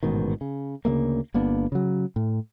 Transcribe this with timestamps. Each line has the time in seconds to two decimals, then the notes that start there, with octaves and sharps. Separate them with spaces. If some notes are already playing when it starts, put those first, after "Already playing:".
0.03 A1 G#2 B2 D#3
0.41 C#3
0.85 D2 C#3 A3 A#3
1.34 G1 A#3 B3 D4
1.72 C#3 F#3
2.16 A2